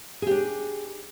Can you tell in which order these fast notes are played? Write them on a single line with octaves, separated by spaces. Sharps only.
G#4 G4 D4